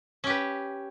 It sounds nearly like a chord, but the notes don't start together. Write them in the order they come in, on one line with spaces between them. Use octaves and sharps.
C#4 G4 B4